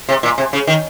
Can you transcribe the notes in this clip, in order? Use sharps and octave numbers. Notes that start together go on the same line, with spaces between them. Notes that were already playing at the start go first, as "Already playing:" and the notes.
C3
A#2
C3
C#3
D#3